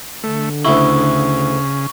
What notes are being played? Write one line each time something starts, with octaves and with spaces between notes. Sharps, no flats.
D3 A3
D2 C#3 E4 C#6